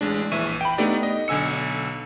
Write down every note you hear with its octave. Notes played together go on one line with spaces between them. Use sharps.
A1 G#3 D4
A#1 E3 E5 C#6 D#7
G5 B5
A3 B3 D4 D#4 G4 D5
D#5
B1 D3 G#5 E6 C#7